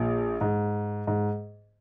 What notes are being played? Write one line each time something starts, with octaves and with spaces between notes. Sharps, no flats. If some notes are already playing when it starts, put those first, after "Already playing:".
Already playing: A#1 A#2
G#2
G#2